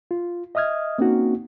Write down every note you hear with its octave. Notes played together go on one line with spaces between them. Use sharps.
F4
D#5 E5 D#6 F6 G#6
A#3 C4 C#4 D#4 F#4